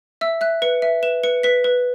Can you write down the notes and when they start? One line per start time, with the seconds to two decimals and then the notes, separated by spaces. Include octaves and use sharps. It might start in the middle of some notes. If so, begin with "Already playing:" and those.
0.21 E5 E6
0.41 E5 F#6
0.62 B4 C#7
0.82 E5
1.03 B4 E7
1.23 B4 C#7
1.43 B4 B6
1.64 B4